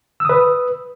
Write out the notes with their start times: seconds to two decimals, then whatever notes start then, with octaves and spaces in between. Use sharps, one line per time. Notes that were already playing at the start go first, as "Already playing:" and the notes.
0.20 E6
0.25 D#6
0.29 B4